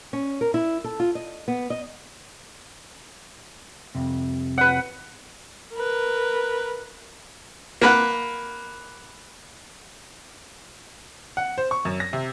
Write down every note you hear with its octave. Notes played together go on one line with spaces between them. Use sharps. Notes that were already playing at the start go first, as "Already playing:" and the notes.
C#4
A#4
E4
A4
F4
D#5
B3
D#5
C2 F2 C3
B4 F#5
A#4 B4
A#3 B4 F#5
F#5
C5
C#6
F#2
A#6
C3